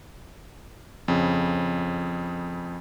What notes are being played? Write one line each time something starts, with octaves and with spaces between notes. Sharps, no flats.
F2 C#3